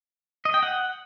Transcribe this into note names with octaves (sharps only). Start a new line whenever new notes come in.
D#5
G5
F#5